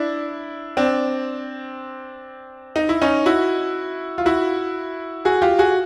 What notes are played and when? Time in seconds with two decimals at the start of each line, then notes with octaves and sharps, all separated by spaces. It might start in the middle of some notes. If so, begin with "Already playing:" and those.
Already playing: D4 E4
0.77 C4 D4
2.76 D#4
2.89 E4
3.02 C#4 D#4
3.26 E4 F#4
4.18 F4
4.26 E4 F#4
5.25 F#4 G#4
5.42 F4 G4
5.59 F#4 G#4